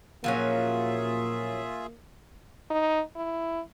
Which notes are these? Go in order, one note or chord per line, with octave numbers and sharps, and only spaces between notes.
A#2 F3 F#3 A#3 C#4 F4 G#4 E5
D#4
E4